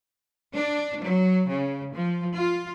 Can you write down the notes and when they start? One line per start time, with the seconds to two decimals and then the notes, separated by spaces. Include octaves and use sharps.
0.55 D4
1.01 F#3
1.48 C#3
1.93 F3
2.35 F4